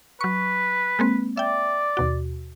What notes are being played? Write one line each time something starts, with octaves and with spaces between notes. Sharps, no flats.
F#3 B4 C#6
G#3 A#3 C4
D5 E5 G5
D#2 B2 F#4